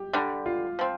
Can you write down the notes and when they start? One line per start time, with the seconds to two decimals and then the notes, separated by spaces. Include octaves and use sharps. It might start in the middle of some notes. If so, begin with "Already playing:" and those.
Already playing: G4
0.13 D3 G3 D4
0.46 F4
0.79 F3 C4